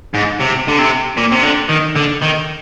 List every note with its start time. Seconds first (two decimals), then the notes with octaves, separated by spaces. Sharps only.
0.14 G#2
0.40 C3
0.68 D3
0.79 C3
1.17 A#2
1.32 C3
1.43 D3
1.69 D#3
1.96 D3
2.22 D#3